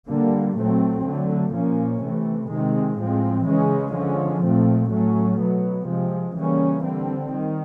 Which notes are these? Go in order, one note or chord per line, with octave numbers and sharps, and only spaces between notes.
D3 G3 A#3
A#2 F#3 A3 C4
D3 F#3 A3
A#2 F3 A#3 C#4
C3 E3 A3
C3 D#3 G#3 C4
A2 F3 G#3 C4
C#3 E3 G#3 C#4
D3 F3 G#3 C#4
A#2 F3 A3 C4
A2 F#3 A3 C#4
B2 F#3 B3
C3 F3 G#3
C#3 E3 G3 A#3 C#4
D3 G3 C4
D#3